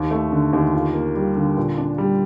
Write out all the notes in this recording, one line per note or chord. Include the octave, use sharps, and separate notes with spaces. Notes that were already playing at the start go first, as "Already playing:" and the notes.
Already playing: D#2
A3
D3
D#2
F4
A#3
G3
D3
A#2
D4
G3